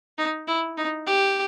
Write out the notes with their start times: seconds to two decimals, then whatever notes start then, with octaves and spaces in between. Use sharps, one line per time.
0.18 D#4
0.48 E4
0.78 D#4
1.07 G4